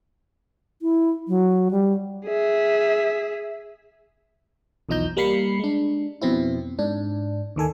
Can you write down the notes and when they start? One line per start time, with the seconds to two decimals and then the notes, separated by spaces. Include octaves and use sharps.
0.82 E4
1.28 F#3
1.71 G3
2.26 G#4 E5
4.89 B1 E2 F3 D#4 A#5 G6
5.17 G3 A#3 A#4 B5 C7 C#7
5.59 G#3 D4
6.21 F2 B2 C4 E4
6.79 G#2 D4
7.56 D#2 D#3 A4 G#5